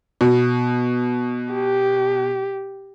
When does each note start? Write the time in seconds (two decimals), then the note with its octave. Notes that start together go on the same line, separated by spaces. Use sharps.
0.21 B2
1.54 G4